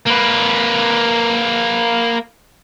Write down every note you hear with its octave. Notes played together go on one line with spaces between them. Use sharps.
A#3 B4